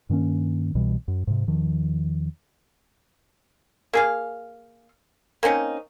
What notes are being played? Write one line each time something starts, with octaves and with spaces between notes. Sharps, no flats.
G2 D#3 A#3 C#4
C2 B2 E3 G3
F#2
G#2 C3
E2 D#3 F3
A#3 G#4 F5
A#3 C4 C#4 D#4